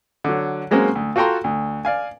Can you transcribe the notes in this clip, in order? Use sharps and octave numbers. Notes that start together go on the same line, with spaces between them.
D3 F#3
F#3 G#3 A#3 C4 C#4
D2
F4 F#4 A4 G5 A#5 C6
D2
D5 F5 G#5